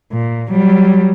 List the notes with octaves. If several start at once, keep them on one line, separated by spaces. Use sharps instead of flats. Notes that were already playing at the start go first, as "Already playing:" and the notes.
A#2
F#3 G3